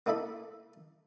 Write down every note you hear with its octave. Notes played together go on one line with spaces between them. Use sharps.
A#3 D#4 E4 A4 B5